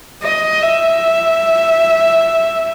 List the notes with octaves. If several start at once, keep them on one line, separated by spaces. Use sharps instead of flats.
D#5
E5